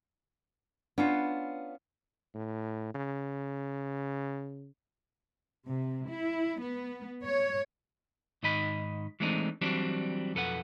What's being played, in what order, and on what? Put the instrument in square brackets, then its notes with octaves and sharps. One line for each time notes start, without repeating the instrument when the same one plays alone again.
[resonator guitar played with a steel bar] B3 C#4 F4 [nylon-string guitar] D4
[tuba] A2
C#3
[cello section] C3
E4
B3
C#5
[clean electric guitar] G#2 D#3 D#5 B5
E3 G#3 A3 C4 D4 D#4
E3 F#3 G3 C4 D4
B1 F2 A4 B4 F#5